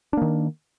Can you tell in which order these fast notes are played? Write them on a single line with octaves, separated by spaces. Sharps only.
D4 A#3 D#3